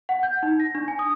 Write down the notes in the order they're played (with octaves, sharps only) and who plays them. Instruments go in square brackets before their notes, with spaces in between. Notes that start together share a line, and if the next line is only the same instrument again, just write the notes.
[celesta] F#5
G6
D#4
A#6
D4
G#5
D#6